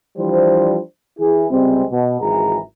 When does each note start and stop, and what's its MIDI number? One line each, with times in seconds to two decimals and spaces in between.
0.18 0.79 52
0.18 0.79 53
0.18 0.79 55
0.18 0.79 62
0.18 0.79 72
1.19 1.47 52
1.19 1.47 64
1.19 1.47 68
1.50 1.84 37
1.50 1.84 48
1.50 1.84 55
1.50 1.84 56
1.50 1.84 60
1.91 2.17 47
2.21 2.58 32
2.21 2.58 37
2.21 2.58 42
2.21 2.58 52
2.21 2.58 68
2.21 2.58 82